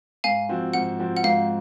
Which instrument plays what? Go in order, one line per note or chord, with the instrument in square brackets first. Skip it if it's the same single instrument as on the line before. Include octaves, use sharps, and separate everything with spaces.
[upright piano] G#2 [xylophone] F5 G#5
[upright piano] F3 C4 F#4
[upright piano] G#2 [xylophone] F#5
[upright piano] F3 C4 F#4
[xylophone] F#5
[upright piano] G#2 [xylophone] F5